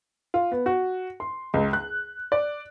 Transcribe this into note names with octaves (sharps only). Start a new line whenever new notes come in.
F4
B3
F#4
C6
C#2
F#6
D5